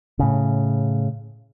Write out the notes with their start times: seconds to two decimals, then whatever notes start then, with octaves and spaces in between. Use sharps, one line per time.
0.19 A2 C#3